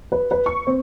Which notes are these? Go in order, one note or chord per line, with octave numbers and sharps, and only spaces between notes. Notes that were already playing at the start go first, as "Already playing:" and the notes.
B4
B4
C#6
C4